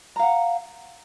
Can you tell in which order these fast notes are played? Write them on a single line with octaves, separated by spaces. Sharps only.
A#5 F5 F#5